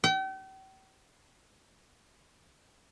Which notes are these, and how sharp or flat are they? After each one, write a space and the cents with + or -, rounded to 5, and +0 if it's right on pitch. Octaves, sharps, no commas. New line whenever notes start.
G5 -40